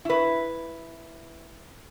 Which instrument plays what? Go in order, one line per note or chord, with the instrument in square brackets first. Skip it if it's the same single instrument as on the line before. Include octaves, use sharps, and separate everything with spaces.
[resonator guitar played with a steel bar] E4 B4